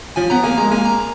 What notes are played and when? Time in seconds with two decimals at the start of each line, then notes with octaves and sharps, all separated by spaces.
0.16 F3 G#5
0.30 B3 A#5
0.43 A#3 G#5
0.57 G#3 A#5
0.71 A#3 G#5
0.85 A#5